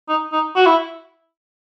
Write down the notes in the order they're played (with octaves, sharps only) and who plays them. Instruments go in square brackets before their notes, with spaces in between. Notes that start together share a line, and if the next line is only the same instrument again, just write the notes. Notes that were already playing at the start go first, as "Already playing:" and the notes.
[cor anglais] D#4
D#4
F#4
E4